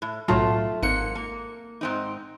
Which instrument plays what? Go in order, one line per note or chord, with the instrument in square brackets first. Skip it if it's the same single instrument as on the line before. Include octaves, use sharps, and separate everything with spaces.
[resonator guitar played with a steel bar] A2
[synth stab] B1 A2 F#3 [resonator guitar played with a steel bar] A3 F4 A5
[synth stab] G#1 C#7 [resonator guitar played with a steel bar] G#2 A#3
[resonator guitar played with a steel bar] A#3
G#2 C4 D#4